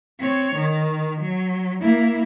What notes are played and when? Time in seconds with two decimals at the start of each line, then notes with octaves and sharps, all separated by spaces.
0.19 C4 C#5
0.55 D#3
1.21 F#3
1.81 A#3 E4